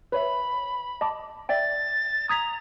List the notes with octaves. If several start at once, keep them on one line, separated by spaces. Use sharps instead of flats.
B4 C#5 E5 B5
D#5 A5 D6
D5 E5 G5 A6
A#5 D#6 G#6 B6